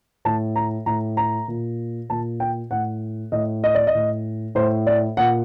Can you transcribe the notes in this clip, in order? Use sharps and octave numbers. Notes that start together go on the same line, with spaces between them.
A2 A5
A#5
A2 A#5
A#5
A#2
A#2 A5
G5
A2 F#5
A2 D#5
D#5
D5
D#5
A2
A2 C5
D5
A#2 F#5